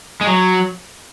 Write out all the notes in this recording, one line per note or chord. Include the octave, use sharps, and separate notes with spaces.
G#3
F#3